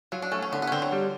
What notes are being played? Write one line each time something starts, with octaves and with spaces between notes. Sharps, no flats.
F#3 F4
D4
A3 C#4
C#4
D3 B3
B3
C#4
D3 C4
F#3
G3